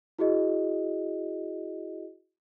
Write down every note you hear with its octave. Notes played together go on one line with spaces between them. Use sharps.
E4 F#4 G#4 D#5